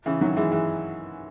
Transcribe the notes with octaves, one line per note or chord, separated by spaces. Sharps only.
C#3 E3
D#3 F#3
E3 G#3
E3 G#3